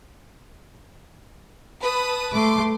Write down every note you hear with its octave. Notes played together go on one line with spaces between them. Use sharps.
B4 A5 D#6
A3 C6 D6